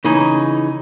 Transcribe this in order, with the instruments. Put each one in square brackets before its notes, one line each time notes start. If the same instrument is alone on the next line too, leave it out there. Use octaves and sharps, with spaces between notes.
[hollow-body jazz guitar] C#3 E3 C#4 D#4